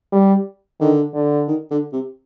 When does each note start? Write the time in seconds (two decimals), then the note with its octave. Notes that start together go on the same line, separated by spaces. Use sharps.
0.13 G3
0.80 D3 D#3
1.14 D3
1.47 D#3
1.70 D3
1.92 C3